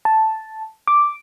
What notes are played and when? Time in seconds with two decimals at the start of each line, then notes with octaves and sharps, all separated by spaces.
0.05 A5
0.87 D6